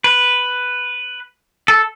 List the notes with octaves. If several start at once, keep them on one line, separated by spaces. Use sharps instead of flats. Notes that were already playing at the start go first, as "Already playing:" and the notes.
B4
A4